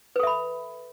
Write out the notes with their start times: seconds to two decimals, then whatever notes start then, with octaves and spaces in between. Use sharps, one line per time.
0.16 B4
0.19 A4
0.23 E5
0.27 B5